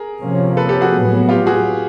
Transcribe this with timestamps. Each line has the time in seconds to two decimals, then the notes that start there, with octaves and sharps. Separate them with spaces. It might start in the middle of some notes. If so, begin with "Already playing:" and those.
Already playing: G#4 A#4
0.21 C3 F3 A#3 C#4
0.57 A4 B4
0.69 G4 A4
0.81 F#4 G#4
0.93 A2 F#3 B3
1.29 F4 G4
1.46 F#4 G#4